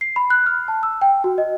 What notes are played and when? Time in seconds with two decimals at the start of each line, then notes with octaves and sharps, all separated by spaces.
0.01 C7
0.16 B5
0.30 F#6
0.46 F6
0.68 A5
0.83 E6
1.02 G5
1.24 F#4
1.38 D#5